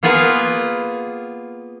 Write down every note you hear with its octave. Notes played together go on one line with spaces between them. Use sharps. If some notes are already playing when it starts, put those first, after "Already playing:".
A#3 B3 F4 G#4 B4 F5